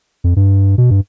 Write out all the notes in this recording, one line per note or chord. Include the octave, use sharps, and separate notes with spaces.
F2
G2
B2
G2